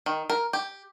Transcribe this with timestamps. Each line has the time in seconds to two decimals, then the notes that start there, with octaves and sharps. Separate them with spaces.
0.06 D#3
0.30 A#4
0.53 G4